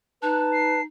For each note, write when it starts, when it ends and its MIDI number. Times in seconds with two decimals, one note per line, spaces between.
0.22 0.84 63
0.22 0.80 71
0.22 0.82 81
0.22 0.42 90
0.52 0.83 96